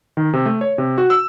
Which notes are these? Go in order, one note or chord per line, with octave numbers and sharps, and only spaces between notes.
D#3
C3
A3
C#5
C3
F#4
E6